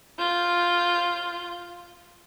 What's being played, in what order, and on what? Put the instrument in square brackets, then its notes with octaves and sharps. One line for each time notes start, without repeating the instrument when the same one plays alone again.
[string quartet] F4 G6